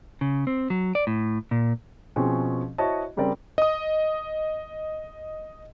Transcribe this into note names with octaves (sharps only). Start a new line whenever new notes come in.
C#3
C4
F#3
D5
A2
A#2
B2 F3 C4 C#4 G#4
E4 F#4 C5 C#5 D#5 A5
C#3 G3 C4 A#4 D5
D#5 D#6